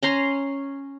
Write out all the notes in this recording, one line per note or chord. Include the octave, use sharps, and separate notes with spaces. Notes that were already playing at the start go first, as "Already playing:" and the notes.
C#4 A#5 C6